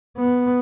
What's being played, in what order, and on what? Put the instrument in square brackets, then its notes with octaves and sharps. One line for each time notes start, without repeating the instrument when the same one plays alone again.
[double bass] B3